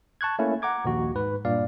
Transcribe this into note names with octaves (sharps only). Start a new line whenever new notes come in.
A5 C#6 F#6 G#6
A3 A#3 C#4 E4
F#5 A#5 D6 G#6
A#1 D#2 F#4
G#2 B4
G2 A#2 D5 F5